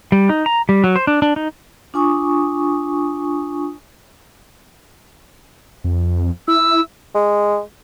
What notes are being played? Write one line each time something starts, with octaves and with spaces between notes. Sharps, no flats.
G3
D#4
A#5
G3
F#3
C5
D4
D4
D#4
D4 F4 G#5 C#6 D#6
F2
E4 E6
G#3